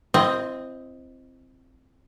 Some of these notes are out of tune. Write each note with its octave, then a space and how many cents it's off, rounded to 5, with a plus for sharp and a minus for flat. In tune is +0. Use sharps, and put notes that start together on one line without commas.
C4 +0 E4 +45 D#5 +0